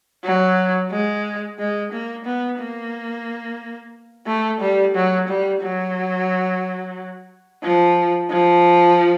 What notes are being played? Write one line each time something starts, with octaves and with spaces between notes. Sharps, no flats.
F#3
G#3
G#3
A#3
B3
A#3
A3
G3
F#3
G3
F#3
F3
F3